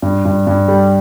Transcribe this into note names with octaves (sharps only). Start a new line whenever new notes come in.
G2
G2
G2
G3